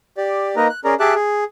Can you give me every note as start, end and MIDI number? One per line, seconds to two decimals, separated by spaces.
0.17 0.56 67
0.17 0.56 74
0.56 0.68 58
0.56 0.68 63
0.56 0.68 70
0.56 0.68 71
0.56 0.68 75
0.56 0.68 82
0.69 0.80 90
0.85 0.94 61
0.85 0.94 68
0.85 0.94 70
0.85 0.94 74
0.85 0.94 82
1.00 1.14 67
1.00 1.14 68
1.00 1.14 76
1.00 1.14 81
1.00 1.14 86
1.00 1.14 90
1.14 1.44 68